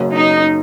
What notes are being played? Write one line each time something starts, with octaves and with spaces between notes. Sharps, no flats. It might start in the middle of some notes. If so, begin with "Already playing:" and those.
Already playing: F#1 F#2 C#3
D#4